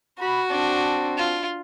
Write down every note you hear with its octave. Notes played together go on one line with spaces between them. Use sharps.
F#4 B5
C4 D4 A5
F4